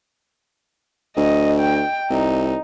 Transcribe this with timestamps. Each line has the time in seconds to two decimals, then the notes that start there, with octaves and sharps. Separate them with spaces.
1.17 D2 D#5
1.60 G5
2.10 C2 D#4